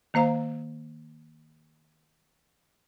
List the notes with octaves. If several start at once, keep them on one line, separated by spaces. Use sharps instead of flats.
D#3 A#3 C5 F5 A#5